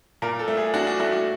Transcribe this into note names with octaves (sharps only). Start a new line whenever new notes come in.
A#2 A#4
A4
A3
G#4
D4 F#4
F#4
A3 F#4
F#4